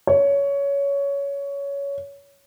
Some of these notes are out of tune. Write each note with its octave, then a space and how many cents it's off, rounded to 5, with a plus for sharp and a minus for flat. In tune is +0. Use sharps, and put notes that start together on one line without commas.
C#5 +15